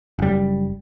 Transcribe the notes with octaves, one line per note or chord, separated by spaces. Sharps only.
F#1 G3